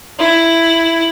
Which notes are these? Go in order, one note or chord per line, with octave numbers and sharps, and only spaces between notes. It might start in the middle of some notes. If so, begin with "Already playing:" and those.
E4